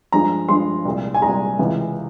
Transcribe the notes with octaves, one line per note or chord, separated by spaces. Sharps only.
G2 F3 G#3 A#5
G2 F3 G#3 C6
C2 A#2 G#3
G#5
C2 A#2 G#3 A#5
C#2 C3 E3 G#3